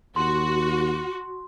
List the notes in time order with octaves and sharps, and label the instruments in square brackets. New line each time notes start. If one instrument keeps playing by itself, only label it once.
[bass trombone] D#2 [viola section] F#4 [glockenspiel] C6